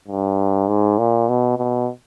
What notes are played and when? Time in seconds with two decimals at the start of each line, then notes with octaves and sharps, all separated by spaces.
0.08 G2
0.68 G#2
0.98 A#2
1.29 B2
1.58 B2